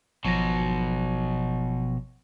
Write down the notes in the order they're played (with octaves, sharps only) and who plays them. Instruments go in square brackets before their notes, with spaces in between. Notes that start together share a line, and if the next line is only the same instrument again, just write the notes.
[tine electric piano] G#1 F3 A#6 [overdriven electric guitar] B2 F#3